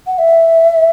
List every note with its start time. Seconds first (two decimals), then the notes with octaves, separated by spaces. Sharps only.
0.07 F#5
0.19 E5